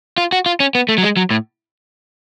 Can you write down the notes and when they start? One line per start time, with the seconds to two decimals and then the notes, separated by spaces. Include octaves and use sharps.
0.18 F4
0.32 F#4
0.46 F4
0.60 C#4
0.75 B3
0.89 A3
0.98 F#3
1.03 G#3
1.17 F#3
1.31 A2